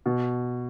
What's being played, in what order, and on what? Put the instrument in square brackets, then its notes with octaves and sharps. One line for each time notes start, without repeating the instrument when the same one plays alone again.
[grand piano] B2